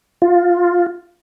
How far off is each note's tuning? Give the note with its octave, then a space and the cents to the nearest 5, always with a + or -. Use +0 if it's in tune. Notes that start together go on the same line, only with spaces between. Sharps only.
F4 +10